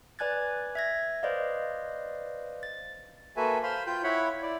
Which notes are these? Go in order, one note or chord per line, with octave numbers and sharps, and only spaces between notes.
B4 D5 G#5 F#6 G#6 A6
E5 G#6 A#6
B4 C5 D5 D#5 F5
A6
A#3 F#4 A4 B4 E5 G#5
C5 F5 B5 C6
F4 G5 G6
E4 C#5 F#5 B5
E4 D5